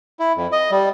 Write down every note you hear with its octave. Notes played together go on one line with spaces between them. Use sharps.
E4
F2
D#5
G3